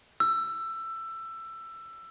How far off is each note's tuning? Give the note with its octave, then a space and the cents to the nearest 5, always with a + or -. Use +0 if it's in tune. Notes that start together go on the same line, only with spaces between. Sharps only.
E6 +15